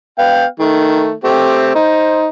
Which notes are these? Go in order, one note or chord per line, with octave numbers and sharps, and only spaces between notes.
B3 F5 G5
D#3 A3
A3 C4 G4
D#4 C5